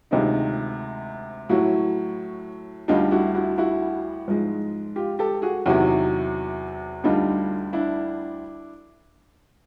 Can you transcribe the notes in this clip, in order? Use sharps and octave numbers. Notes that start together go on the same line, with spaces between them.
D2 C3 D#3 G#3 D#4 F4
A2 F#3 E4 F#4
D2 D3 G3 D#4 F4
E4 F#4
E4 F#4
E4 F#4
G#2 F3 G#3
F4 G4
G4 A4
F#4 G#4
E2 C3 D#3 F#3 E4 F#4
D2 D3 G3 D#4 F4
D4 E4